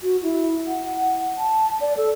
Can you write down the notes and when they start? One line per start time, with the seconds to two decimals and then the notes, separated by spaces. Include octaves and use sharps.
0.03 F#4
0.23 E4
0.67 F#5
1.38 A5
1.81 D5
1.97 A4